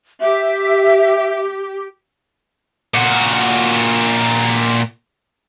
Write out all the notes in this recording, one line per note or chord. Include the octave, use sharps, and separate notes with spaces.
G4 E5
A#2 F#4